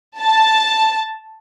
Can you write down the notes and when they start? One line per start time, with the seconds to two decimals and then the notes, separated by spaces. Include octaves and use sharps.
0.19 A5